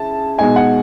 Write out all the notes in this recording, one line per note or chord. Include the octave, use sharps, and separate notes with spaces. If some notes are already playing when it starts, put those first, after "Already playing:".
Already playing: C#3 E4 A5
B2 G#3 D#4 G#5
F#5